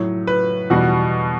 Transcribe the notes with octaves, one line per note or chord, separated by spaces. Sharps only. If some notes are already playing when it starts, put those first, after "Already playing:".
Already playing: A2 F#3 C#5
B4
E2 B2 G3 F#4